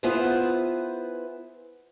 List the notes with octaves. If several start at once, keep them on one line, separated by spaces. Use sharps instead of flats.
B3 E4 F4 G#4 B4 C5